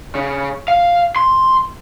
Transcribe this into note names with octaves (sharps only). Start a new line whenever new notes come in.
C#3
F5
C6